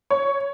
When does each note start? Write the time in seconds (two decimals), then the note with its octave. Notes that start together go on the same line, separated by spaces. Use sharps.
0.10 C#5